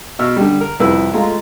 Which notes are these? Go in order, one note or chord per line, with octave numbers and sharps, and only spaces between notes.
B2 E6 F6
D3 G3
A#4
C2 F2 E4 B4 E6
G#3 A3 F4 A#5